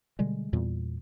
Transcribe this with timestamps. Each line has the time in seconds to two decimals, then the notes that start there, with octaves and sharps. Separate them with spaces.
0.19 B2 D3 G3 G#3
0.53 E2 A#2 G3